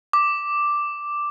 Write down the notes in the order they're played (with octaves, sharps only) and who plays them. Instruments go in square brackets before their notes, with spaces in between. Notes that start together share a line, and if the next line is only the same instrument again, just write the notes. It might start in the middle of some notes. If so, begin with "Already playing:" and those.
[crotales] D6